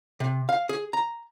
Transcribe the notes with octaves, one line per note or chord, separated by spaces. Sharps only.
C3
F5
G#4
A#5